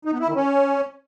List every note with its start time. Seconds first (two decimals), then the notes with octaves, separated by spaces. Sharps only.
0.05 D#4
0.13 B3
0.20 E4
0.28 D#3
0.36 C#4